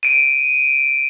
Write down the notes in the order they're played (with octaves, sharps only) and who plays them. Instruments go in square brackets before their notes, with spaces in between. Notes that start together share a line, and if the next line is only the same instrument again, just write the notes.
[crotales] D7 D#7